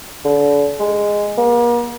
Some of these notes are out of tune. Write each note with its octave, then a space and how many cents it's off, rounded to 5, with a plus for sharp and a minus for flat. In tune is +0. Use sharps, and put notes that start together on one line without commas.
D3 -35
G#3 -10
A#3 +40